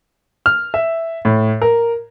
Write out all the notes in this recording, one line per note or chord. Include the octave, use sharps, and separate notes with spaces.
F6
E5
A2
A#4